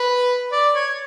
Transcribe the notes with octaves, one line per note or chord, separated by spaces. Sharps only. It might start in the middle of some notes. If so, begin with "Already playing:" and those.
Already playing: B4
D5
C#5